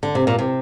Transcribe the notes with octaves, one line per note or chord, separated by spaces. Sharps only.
D3
C3
A#2
C3